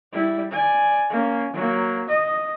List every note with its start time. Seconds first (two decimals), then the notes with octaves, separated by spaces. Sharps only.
0.13 G3 E4
0.51 D5 G#5
1.10 A#3 C#4
1.53 F#3 A#3
2.09 D#5